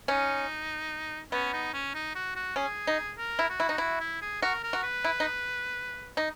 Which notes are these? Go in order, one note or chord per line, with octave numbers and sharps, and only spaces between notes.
C#4 D#4
B3 C#4
D#4
C#4
D#4
F#4
F#4
C#4 G#4
D#4
A#4
E4
F#4
E4
D#4
E4 F#4
E4
G#4
F#4 A#4
A#4
F#4
B4
E4
D#4
D#4